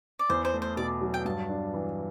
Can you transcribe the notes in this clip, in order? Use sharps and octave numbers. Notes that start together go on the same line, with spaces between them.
D5
E2 C5
C5
A3
C5
B2 D5
F#3
G5
G2 A5
D4
E3